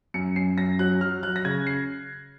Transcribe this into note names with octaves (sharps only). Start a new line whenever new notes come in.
F#2 C#7
F#2 C7
F#2 A#6
F#3 F#6
F#3 F6
F#3 F#6
A#6
C#3 G#6
C7